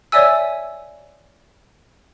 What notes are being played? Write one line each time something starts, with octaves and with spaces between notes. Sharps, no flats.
C#5 D5 E5 G#5 E6